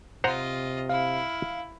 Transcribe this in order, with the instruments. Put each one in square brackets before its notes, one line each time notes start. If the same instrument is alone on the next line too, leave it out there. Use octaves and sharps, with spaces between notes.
[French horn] C3 [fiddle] F4 D#5 [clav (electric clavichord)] C5 F#5 A#5
[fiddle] E4 [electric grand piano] F5